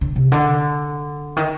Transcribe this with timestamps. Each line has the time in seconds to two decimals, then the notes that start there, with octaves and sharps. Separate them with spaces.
0.01 D3
0.16 C3
0.32 D3
1.36 D#3